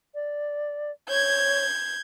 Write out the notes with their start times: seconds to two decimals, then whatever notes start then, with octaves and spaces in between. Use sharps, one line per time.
0.15 D5
1.09 C#5 G6 G#6